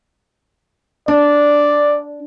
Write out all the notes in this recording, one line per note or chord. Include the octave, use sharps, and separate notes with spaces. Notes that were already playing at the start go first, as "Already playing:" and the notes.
D4 D5